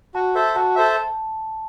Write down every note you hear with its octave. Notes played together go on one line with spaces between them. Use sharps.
F#4 A5
A4 C5 E5
F#4 A5
A4 C5 E5